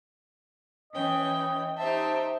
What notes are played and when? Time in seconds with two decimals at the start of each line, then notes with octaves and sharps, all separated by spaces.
0.93 E3 C#4 D#5 G5
1.78 D#4 G4 C5 E5 A5